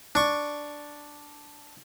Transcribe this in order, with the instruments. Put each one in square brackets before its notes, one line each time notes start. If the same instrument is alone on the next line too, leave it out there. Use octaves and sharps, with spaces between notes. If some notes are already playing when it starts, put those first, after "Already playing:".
[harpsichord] D4 C#6